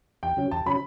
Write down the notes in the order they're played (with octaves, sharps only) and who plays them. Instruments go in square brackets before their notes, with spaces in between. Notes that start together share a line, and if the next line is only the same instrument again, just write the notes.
[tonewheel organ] E2 [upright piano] G5
[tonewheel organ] C#3 F#3 C#4
[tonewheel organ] E2 [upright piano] A5
[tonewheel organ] C#3 F#3 C#4 [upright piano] B5